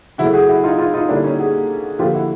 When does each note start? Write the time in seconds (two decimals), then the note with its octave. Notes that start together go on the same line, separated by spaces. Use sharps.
0.18 C#3 F#3 A3 E4 F#4
0.33 F#4 G#4
0.48 E4 F#4
0.64 D#4 F4
0.78 D#4 F4
0.94 D#4 F4
1.09 D3 G3 A#3 D4 E4
1.24 C#4 D#4
1.39 F#4 G#4
1.99 D3 F3 A#3 F4 G4
2.14 E4 F#4